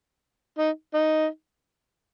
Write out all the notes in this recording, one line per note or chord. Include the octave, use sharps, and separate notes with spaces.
D#4
D#4